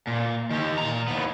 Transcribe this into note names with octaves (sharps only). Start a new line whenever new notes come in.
A#2
D#3 G4
A#2 A#5
D#2 B3